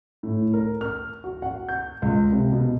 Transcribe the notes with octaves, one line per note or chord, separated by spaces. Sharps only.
A2
A#4
F6
F#4
F#5
G6
C#2
C3
B2